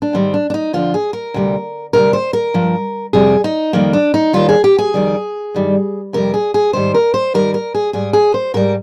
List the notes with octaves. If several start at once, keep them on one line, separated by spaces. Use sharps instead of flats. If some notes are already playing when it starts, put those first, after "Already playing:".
D4
G#2 D#3 G3 C4
D4
D4
D#4
F2 D3 F3 F4
G#4
A#4
D2 C3 G3
D2 C3 G3 A#4
C5
A#4
G2 F3
F2 C3 G3 G#4
D#4
F2 D#3 G3 A#3
D4
D#4
D#2 D#3 G3 F4
G#4
G4
G#4
F2 D#3 G3
G2 D#3 G3
F2 C3 G3 A#4
G#4
G#4
G#2 D#3 G3 C5
A#4
C5
G#2 D#3 G3 A#4
A#4
G#4
G#2 G3 G#4
G#4
C5
G#2 G3 A#4